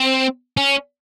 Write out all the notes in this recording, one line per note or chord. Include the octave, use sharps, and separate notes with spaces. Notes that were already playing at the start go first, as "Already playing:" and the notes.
Already playing: C4
C#4